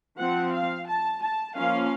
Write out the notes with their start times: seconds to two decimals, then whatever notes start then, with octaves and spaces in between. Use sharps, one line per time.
0.17 F3 C4 F#5
0.52 F5
0.86 A5
1.21 A5
1.55 F3 A#3 C#4 F5